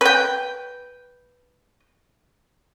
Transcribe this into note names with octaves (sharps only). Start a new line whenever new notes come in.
B4 G5